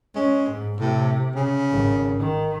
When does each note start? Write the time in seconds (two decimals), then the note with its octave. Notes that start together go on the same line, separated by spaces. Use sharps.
0.15 G#3 C#4
0.51 G#2
0.80 A2 C3
1.35 C#3
1.71 G#1
2.19 D#3